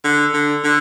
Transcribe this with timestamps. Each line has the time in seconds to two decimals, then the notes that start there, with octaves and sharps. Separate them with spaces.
0.05 D3
0.34 D3
0.64 D3